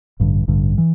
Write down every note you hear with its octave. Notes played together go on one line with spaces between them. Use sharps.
A1 G2 D3
A1 G2 D3
E3